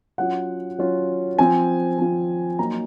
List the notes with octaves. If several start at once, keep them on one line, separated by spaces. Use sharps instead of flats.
F#3 C#4 F4 F#5
F#3 C#4 F4
F3 C4 F4 G#5
F3 C4 F4
F#3 A#3 D#4 A#5